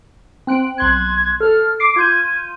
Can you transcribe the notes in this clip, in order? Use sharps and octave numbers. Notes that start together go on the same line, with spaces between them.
C4 F#6 D7
B1 C6 F#6 G#6
A4 F6
D6 C7 D7
F4 G6 G#6 D#7